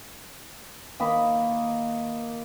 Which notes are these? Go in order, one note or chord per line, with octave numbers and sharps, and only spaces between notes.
D#3 A#3 D#5 B5